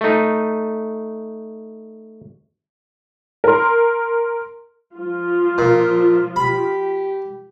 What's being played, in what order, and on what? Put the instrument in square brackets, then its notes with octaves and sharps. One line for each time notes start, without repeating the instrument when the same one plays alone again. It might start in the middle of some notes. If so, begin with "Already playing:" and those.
[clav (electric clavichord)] A3 D#4
[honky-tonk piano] A#4 C6
[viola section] F3 F4
[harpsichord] A#2
[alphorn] G4 [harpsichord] B5